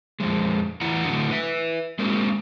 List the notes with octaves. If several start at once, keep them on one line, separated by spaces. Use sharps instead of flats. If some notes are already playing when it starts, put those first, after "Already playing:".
F2 G#2 F3 G#3
E2 A2 E3 E4 F#5 A#5
A2 D3 F#3 F#5
B4 E5
G#3 A#3 C4 F#4